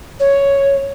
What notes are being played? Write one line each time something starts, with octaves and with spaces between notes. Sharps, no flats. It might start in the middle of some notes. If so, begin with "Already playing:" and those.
C#5